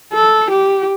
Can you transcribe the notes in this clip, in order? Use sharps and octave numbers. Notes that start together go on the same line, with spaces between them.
A4
G4